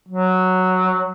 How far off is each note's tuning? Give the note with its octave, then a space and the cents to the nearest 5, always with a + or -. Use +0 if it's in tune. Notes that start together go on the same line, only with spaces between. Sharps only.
F#3 +0